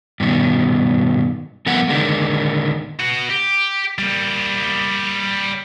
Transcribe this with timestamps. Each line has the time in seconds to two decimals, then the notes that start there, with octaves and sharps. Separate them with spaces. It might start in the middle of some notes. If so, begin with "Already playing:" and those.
0.20 G2 B2 D#3
1.66 G2 F3 A3 B3 A#4 F#5
1.88 D3 D#3 G#3 A#3
3.00 F#4 B4
3.30 G4
3.98 G3 A#3